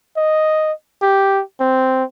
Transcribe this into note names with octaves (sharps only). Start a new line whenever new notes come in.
D#5
G4
C4